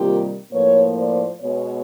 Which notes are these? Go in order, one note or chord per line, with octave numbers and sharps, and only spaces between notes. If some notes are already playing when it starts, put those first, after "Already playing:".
Already playing: C3 D#3 G3 A#3 F4 G4
A2 F3 A#3 B4 C#5
C5 D5
B2 G#3 B3 B4 C#5